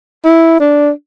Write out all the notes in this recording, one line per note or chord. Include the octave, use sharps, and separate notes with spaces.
E4
D4